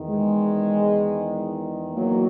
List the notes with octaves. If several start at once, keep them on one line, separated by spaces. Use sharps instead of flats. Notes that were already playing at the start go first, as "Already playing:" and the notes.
Already playing: E2 D#3
G#3
F#3 A#3